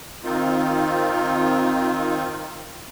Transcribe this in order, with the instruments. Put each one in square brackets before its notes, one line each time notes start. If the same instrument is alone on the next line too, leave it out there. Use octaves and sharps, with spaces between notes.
[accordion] D#3 C4 D#4 F4